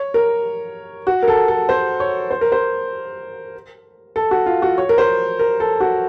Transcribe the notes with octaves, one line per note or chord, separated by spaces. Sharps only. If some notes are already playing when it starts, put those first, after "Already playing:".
Already playing: C#5
A#4
F#4
A#4
A4
A4
C5
C#5
C5
A#4
C5
A4
F#4
F4
F#4
C#5
A#4
C5
A#4
A4
F#4